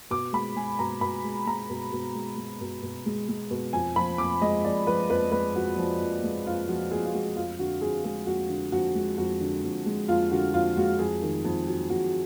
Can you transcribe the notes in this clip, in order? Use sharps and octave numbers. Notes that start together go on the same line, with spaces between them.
B2 D6
G#3 B5
G#3 G#5
B2 A#5
B2 B5
G#3
G#3 A#5
B2
B2
G#3
G#3
B2
B2
G#3
G#3
B2
F2 G#5
F3 B5
F2 D6
G#3 D#5
F2 D5
F3 B4
F2 B4
G#3 B4
F2 F#4
F3
F2
G#3
F2 F4
F3 F#4
F2 G#4
F4
G#3 F#4
F2 F4
D3 F#4
F2 G#4
G#3 G#4
F2 F#4
D3
F2 F#4
G#3
F2 F#4
D3
F2
G#3
F2 F4
D3 F#4
F2 F4
G#3 F#4
F2 G#4
D#3
F2
F#3
F2 F#4